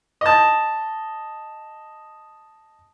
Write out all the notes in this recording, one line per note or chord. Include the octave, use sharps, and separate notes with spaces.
D#5 A5